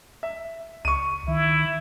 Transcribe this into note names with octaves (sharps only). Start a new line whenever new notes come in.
E5
C#2 C#6 D#7
D#3 E4